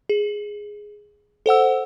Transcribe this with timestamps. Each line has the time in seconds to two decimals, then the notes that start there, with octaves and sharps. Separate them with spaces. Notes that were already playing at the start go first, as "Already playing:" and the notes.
0.09 G#4
1.46 A4 C5 F#5 E6